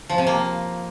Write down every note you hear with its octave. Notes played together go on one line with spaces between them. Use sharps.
F3
C3
A#3